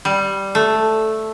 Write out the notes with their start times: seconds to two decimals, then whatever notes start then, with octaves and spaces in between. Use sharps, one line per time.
0.05 G3
0.55 A3